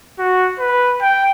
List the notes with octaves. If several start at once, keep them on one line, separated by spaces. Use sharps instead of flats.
F#4
B4
G5